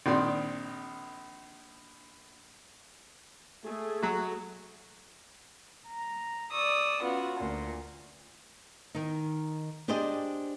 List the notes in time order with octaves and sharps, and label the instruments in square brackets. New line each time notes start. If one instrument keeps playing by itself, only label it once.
[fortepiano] A#1 D#3 C4 D5 C6
[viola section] A3 G#4
[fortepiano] F#3 F#4
[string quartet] A#5
D5 C#6 D#6 E6
B3 C#4 F4 F#4
D2 A#2
[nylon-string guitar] D#3 D#4
D4 G4 G#4 C5 D5 D#5